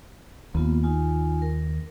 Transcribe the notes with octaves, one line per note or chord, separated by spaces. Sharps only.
D#2 A#3 B3 F4
D#4 F4 G#5
A#4